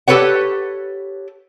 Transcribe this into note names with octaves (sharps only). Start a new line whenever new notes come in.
G4 A4 B4 C#5 F#5